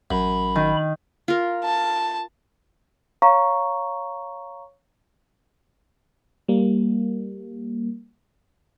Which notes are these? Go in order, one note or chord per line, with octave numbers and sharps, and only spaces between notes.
A1 F#2 B5
D#3
F4 A#4
A5
C#5 F5 A#5 C#6
G3 A#3